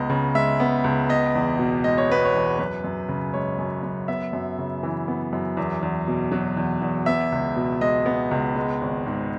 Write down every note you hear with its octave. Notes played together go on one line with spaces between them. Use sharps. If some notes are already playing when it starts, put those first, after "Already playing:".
Already playing: C#2 B3 D#5
C#3
G#3 E5
B3
C#2
B3 D#5
E2
B2
G#3 D#5
C#5
B3 B4
C#5
E2
F#2 B4
F#2
C#3
G#3 C#5
F#2
F#2
B3 E5
F#2
C#3
E3
B3
F#2
E2
E2
B2
F#3
E2
E2
B3 E5
C#2
B2
G#3 D#5
B3
C#2
G#3
G#1
G#2